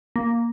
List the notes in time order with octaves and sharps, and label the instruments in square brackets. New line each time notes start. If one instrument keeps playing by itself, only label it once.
[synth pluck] A#3